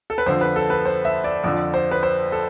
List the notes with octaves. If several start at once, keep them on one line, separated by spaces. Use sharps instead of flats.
A4
B4
F2 D3 F3 C5
B4
A4
B4
C5
E5
D5
F2 D3 F3 D5
C5
B4
C5
A4